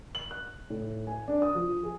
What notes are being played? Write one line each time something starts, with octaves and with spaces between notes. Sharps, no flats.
F#7
F#6
A2
G#5
D4
D#6
F3
G#4